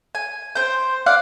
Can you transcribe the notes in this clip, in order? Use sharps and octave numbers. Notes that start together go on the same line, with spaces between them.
G#5
C5 G5
D5 F5 F#5